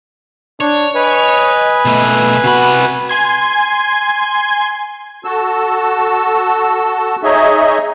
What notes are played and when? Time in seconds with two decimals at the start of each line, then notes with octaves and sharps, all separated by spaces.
0.60 D4 C#5
0.95 B4 D#5 G#5
1.85 B2 A3
2.44 C3 F#4 B5
3.09 G#5 C6 G#6
5.25 F#4 A4 E6
7.23 D#4 G#4 C#5 D#5 E5